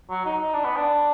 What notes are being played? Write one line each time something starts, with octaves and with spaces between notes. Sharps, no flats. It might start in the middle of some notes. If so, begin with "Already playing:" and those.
F#3
D#4
D#4
D4
B3
D4